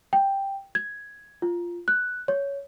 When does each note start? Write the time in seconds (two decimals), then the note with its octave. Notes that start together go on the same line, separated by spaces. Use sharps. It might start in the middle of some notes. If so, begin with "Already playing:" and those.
0.13 G5
0.75 G#6
1.42 F4
1.88 F#6
2.28 C#5